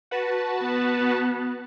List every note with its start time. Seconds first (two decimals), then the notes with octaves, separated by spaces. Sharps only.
0.11 F#4 B4 A5
0.61 B3